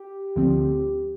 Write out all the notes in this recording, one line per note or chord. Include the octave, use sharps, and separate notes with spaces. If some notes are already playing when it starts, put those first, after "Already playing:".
Already playing: G4
D2 D3 F3 C4